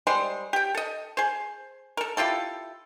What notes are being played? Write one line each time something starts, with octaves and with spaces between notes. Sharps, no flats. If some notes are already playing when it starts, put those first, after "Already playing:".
G3 G#3 C5 C6
G4 G5
A4 D#5
G#4 C5
A4 A#4
E4 F4 G4 A4